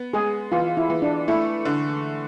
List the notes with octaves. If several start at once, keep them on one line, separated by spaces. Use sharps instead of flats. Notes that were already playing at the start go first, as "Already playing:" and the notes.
Already playing: B3
G#3 G#4
E3 F4
E4
E3
D4
A3 E4
D3